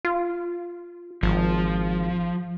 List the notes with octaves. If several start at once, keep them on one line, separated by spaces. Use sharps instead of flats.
F4
G#1 F3